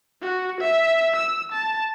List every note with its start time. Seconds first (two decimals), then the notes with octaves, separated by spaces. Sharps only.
0.22 F#4
0.61 E5
1.16 E6
1.51 A5